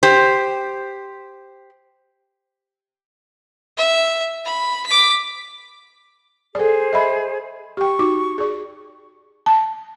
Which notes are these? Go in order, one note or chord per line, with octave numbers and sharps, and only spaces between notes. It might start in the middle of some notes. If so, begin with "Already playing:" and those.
G4 C5
E5
B5
D6 B6
G#4 A4 C5 D5
D#5 E5 B5
G4 G5 C#6
D#4 F#4 D6
G#4 D5
A5